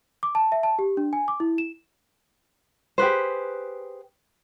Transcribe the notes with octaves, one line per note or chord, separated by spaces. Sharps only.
D6
A5
E5
A5
G4
D4
G#5
D6
E4
E7
G4 G#4 B4 C5